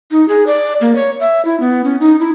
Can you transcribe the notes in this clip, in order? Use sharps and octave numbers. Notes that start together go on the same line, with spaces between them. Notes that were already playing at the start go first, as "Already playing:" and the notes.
D#4
G#4
D5
A#3
C#5
E5
E4
B3
C#4
D#4
E4